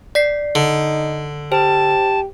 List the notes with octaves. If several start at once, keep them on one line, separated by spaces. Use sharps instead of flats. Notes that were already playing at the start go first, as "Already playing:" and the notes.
D5 B6 C7
D3 D#4
G4 C5 A5